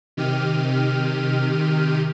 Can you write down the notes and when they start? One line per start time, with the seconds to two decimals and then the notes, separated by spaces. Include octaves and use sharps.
0.17 C3 D#3 G4 F6 D#7